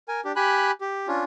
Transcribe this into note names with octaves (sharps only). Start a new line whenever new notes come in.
A#4 G#5
D4 G4
G4 G#5 B5 F#6
G4
C#4 D4 F4